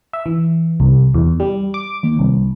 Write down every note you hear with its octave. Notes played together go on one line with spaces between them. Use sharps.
E5
E3
C2
E2
G3
D6
D#2
C2